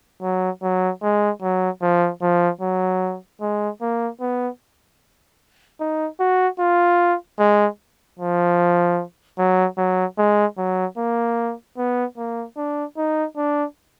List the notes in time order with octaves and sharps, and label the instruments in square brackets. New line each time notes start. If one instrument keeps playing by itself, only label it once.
[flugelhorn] F#3
F#3
G#3
F#3
F3
F3
F#3
G#3
A#3
B3
D#4
F#4
F4
G#3
F3
F#3
F#3
G#3
F#3
A#3
B3
A#3
D4
D#4
D4